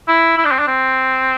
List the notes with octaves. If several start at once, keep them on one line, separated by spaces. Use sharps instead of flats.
E4
E4
D4
C4
D4
C4